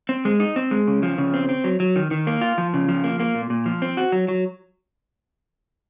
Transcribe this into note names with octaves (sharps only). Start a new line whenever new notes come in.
C4
G#3
D#4
C4
G#3
C#3
F3
C#3
C4
C4
F#3
F#3
D#3
D#3
A#3
F4
F3
C#3
F3
A#3
A#3
A#2
A#2
F3
C4
F#4
F#3
F#3